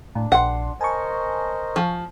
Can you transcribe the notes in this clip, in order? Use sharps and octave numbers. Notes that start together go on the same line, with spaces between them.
A2 D4
A#1 F#5 C6
A#4 C5 D#5 G#5 A5 C#6
F3